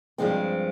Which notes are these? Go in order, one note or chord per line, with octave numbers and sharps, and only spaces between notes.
G2 F3 G#3 C4